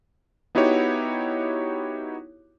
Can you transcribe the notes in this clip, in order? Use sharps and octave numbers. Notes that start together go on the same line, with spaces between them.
B3 D#4 E4 F#4 G4 C#5